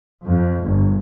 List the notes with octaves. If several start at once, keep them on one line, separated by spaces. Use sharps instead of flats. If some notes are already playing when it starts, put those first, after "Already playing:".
F2
G1